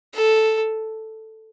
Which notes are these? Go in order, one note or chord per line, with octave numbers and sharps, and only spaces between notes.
A4